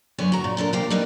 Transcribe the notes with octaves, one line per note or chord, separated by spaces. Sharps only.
F#2 D3 B3 C#5 G#5
F#4 A#5
A#2
D3 D4 A4 A#4
E2 C3 A#3 G4 F5
G3 B3 D#4 A#4 D#5